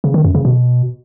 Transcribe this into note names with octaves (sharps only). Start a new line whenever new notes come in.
C#3
D#3
F#2
C#3
B2